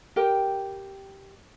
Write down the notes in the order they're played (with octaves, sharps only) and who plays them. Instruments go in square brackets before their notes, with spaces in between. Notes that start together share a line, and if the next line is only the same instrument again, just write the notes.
[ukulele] G4 A#4 G5